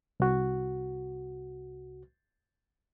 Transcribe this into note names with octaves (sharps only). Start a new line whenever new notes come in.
C2 F#4